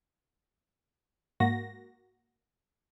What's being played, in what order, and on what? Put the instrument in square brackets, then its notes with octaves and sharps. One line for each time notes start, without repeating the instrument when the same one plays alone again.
[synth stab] G#2 A#3 F#4 A#6